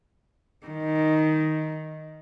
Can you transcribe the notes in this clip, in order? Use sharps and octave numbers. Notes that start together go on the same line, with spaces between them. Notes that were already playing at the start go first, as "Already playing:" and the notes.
D#3